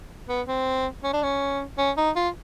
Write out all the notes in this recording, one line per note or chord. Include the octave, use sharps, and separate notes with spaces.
B3
C4
C#4
D4
C#4
C#4
D#4
F4